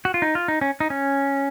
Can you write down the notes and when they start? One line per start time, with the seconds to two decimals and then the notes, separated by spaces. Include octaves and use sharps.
0.05 F#4
0.14 F4
0.22 D#4
0.35 F4
0.48 D#4
0.61 C#4
0.80 D#4
0.90 C#4